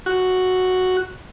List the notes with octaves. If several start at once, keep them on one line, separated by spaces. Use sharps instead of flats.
F#4